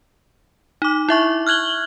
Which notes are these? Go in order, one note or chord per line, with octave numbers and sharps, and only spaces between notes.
D#4 D6
E4 E5 C#6
F6 F#6 G#6 F#7 G7